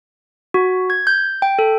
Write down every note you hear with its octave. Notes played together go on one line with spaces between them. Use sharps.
F#4
G#6
G6
G5
A4